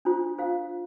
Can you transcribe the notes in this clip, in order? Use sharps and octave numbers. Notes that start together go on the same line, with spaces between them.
D4 F4 C5
D4 F4 C5 F5